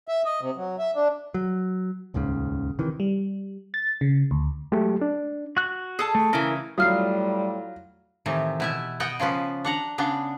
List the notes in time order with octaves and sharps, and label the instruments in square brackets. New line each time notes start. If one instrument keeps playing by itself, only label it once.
[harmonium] E5
D#5
C3
F#3
E5
D4
[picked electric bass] F#3
D#1 C#2 G#2 C#3
C3 D#3 E3
[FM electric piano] G3
A6
C#3
D2
[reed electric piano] F#3 G#3 A3 G4
D4
[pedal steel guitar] F#4 F#6
[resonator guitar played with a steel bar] G#4 A4 A5
[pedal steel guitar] A3
[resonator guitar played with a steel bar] C#3 E3 [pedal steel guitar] E4 A#4
[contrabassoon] A2 [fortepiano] F#3 F4 [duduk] G3 [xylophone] D#6 F6 C7
[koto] A2 C3 D#3 E3
B2 E4 E5
B3 D#5 F#5 G5
C#3 F3 C#4 B4
D4 F#5 A#5
C#3 B3 D4